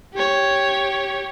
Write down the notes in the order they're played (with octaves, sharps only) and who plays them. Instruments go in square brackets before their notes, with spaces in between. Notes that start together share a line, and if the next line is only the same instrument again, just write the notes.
[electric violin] G4 C#5